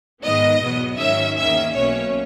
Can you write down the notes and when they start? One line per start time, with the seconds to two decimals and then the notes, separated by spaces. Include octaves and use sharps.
0.22 G#2 D#3 G#3 B3 D#5
0.60 E2 B2 F#3 B3
0.98 G#2 D#3 F#3 C#4 E5
1.37 E2 D#3 A#3 C#4 E5
1.75 B1 B2 A#3 C#4 C#5